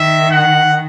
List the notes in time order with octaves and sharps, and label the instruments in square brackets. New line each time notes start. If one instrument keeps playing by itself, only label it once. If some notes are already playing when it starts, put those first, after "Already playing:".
Already playing: [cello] D#3 [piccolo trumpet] E5
[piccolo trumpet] F#5